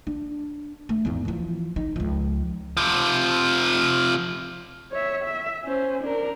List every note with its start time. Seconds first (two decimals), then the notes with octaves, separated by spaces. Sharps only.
0.07 D4
0.89 A3
1.05 E2 G#2
1.25 E3 F3
1.76 D#4
1.96 C#2 F3
2.77 C3 F3
4.92 C#5 E5
5.24 E5
5.64 C#4 C5
6.02 D4 A#4